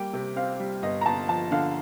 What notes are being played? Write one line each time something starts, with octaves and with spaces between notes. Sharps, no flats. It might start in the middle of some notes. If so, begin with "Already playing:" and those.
Already playing: G3 A#3 G5
C3
C4 F5
G3
G1 D#5
A#5
G1 A5
F3 A5
D3 F5